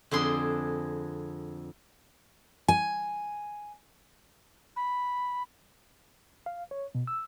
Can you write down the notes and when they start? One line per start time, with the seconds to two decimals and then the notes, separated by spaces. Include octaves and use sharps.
0.11 F2 D3 G#4 C6
2.68 G#5
4.76 B5
6.46 F5
6.71 C#5
6.95 B2
7.07 E6